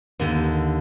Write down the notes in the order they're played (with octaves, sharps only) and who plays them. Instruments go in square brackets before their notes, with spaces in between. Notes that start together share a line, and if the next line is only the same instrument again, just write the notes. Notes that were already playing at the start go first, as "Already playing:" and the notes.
[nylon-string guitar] D#2 D3